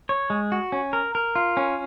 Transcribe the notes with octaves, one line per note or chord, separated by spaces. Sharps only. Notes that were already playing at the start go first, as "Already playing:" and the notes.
C#5
G#3
F#4
C#4
A#4
A#4
F4
C#4